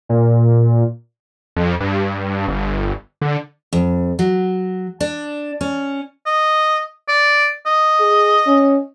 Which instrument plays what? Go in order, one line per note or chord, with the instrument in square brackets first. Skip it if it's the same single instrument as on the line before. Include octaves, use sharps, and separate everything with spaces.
[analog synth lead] A#2
[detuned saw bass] F2
G2
G1
D3
[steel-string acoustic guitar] F2
F#3
D4
C#4
[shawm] D#5
D5
D#5
[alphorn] G#4
C#4